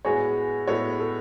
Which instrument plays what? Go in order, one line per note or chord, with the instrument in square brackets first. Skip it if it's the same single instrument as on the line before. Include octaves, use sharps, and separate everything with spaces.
[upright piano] A2 G#3 B3 F#4 C#5 [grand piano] G#4
[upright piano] A2 G#3 B3 F#4 C#5 [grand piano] A4
[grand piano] A4